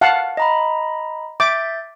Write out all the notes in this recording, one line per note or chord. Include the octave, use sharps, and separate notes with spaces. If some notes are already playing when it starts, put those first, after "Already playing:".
F5 F#5 A5
D#5 A#5 B5
E5 D6 G6 A6